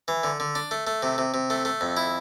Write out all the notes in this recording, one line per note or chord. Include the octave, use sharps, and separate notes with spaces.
E3
D3
D3
D4
A3
A3
C3
C3
C3
A3
A3
F2
E4